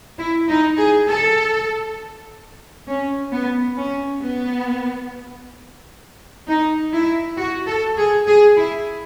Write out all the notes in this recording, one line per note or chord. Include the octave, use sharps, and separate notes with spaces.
E4
D#4
G#4
A4
C#4
B3
C#4
B3
D#4
E4
F#4
A4
G#4
G#4
E4